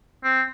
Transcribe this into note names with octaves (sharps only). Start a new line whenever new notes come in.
C4